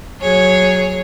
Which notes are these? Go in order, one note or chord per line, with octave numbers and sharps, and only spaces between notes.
F#3 G#4 C#5